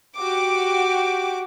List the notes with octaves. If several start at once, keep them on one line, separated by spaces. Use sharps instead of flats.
F#4 G4 D6